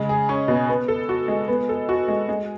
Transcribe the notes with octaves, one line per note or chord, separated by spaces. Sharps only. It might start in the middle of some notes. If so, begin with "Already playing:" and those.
Already playing: C#3 G#3
G#4
C#4
B2
B3
A4
F#4
G#3
B3
A4
F#4
G#3
G#3